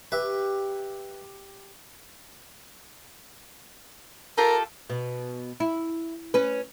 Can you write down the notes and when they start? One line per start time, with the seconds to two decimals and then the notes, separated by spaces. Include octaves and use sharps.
0.12 G4 B4 E5
4.38 F4 G4 A4 A#4
4.90 B2
5.60 E4
6.34 C#4 B4